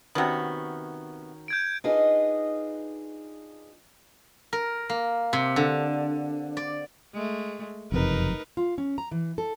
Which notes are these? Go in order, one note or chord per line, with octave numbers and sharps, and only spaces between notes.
C3 D#3 B3 C#4 F#4
G6 G#6 D7
D4 D#4 F4 G#4 B4 D#5
A#4
A#3
C3
D3
D5
G#3 A3
F#1 F2 C3 D#4 A#4 B4
F4
C#4
A#5
E3
A4